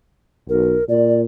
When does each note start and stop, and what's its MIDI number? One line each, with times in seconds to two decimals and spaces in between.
0.49 0.77 35
0.49 0.84 70
0.89 1.23 46
0.89 1.21 74